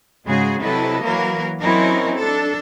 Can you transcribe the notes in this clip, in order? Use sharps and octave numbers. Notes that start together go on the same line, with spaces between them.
G#2 C#3 G#3 F#4 G#4
C3 F#3 E4 A4 B4 D#5
E3 F#3 A#3 A#4 B4
F#3 C4 C#4 D#4 E4 A#4
D4 A4